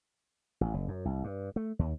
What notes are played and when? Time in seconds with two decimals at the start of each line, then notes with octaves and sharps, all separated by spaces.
0.61 A1
0.74 F#1
0.88 F#2
1.05 C2
1.24 G2
1.56 A3
1.79 D#2